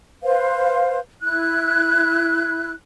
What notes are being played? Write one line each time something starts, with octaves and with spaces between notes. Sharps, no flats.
B4 C5 F5
E4 F#6